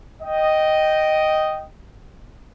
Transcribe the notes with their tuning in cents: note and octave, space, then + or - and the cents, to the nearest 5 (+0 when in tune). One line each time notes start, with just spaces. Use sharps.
D#5 +0 G5 -10